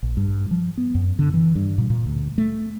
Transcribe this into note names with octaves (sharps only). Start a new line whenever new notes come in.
A#1
G2
F3
B3
F#2
D3
E3
G2
A#2
A#2
D2
A3